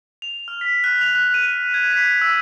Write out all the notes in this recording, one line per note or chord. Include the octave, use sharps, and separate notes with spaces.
F7
F6
B6
F#6
F7
F#6
D#7
G#6
B6
E6